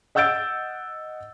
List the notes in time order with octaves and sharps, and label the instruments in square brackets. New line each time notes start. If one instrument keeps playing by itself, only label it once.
[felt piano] D#5 F#5 E6 G6 A6 D7